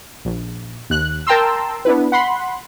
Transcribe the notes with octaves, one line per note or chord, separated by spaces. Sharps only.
A#1
D#2 F#6
A#4 G5 A5 A#5 C6 E6
B3 D4 E4 B4
F#5 B5 C6